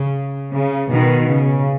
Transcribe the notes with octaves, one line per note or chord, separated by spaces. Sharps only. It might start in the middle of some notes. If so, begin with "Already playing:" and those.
Already playing: C#3
C#3
B2 D#3
C#3